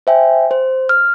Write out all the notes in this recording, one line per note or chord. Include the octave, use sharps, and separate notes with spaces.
C5 E5 G5 G#5
C5
F6